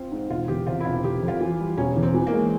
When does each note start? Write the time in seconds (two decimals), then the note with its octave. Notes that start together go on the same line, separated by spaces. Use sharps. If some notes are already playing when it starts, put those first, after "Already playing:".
Already playing: C4 F4
0.11 G#2
0.29 E1 F4
0.48 E2 G4
0.67 C3 F4
0.80 E4
0.85 E1 F4
1.03 F1 G4
1.22 F2
1.28 F4
1.41 E3
1.60 G3
1.77 E1 C#4
1.96 E2
2.03 C4
2.14 E3
2.27 A#3
2.33 G#3